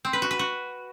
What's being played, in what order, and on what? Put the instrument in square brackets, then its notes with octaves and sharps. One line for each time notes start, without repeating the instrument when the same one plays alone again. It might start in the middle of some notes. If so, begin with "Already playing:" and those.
[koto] C4
B4
F#4
B4
F#4